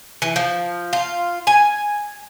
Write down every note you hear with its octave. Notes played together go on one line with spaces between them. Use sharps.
E3
F3
F4
G#5